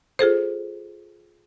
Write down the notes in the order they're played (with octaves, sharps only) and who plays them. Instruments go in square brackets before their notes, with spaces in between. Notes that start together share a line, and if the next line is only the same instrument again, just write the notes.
[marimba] F4 G#4 A4 C5